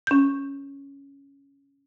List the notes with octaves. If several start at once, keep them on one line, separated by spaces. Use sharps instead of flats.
C#4 G6